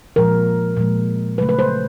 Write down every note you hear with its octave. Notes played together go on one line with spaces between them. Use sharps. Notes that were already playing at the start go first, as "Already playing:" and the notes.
A#2 F3 G#3 A#4
A#2 F3 G#3
C#3 F#3 A3 B4
B4
C5